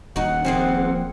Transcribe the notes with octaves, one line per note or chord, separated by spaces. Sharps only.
D#1 D#4 F#4 F#5
F3 A#3 C4 G#4